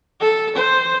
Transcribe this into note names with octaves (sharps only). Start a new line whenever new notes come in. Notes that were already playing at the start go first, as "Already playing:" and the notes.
A4
C5